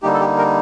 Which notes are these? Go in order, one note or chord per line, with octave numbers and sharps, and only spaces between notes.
D3 G3 A#3 D#4 G4
A4
G4
A#4